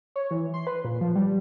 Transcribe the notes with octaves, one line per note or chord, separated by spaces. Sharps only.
C#5
E3
C6
B4
A#2
F3
G3